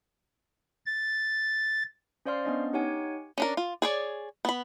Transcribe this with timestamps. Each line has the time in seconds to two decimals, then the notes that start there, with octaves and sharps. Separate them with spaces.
0.86 A6
2.25 C#4 C5 D5 F5 C6 F6
2.45 B3 C#4 D4 D#5
2.73 D#4 G4 C#5 F#5 G#5
3.38 C#4 D4 A#4
3.57 F4
3.82 G#4 C#5 D5
4.45 B3 B5